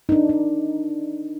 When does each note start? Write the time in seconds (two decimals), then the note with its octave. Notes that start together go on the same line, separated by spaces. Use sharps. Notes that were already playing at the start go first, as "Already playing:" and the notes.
0.09 D4 D#4
0.29 D4